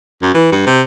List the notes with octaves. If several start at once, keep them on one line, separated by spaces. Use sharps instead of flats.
F#2
E3
G2
C3